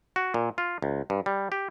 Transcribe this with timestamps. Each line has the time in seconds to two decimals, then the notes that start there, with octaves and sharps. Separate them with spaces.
0.16 F#4
0.34 A#2
0.58 F4
0.82 C#2
1.10 G2
1.26 G3
1.52 G4